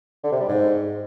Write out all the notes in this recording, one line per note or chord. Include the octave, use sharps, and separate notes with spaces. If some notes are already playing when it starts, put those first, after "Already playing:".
D3
C3
G3
G#2